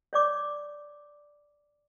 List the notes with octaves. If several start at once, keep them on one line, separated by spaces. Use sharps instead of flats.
C#5 D5 D6